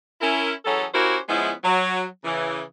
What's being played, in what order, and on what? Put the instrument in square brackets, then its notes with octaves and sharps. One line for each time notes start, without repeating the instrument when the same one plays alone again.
[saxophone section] C#4 E4 A#4
E3 F#3 C#4 G#4 A4
C#4 E4 F#4 G4 A#4 C5
F3 G#3 B3 C#4 E4
F#3
C#3 E3